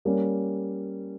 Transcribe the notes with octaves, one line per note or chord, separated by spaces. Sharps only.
G3 A#3 C#4